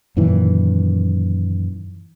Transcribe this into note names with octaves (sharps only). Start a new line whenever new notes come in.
F#2 A#2 D#3 E3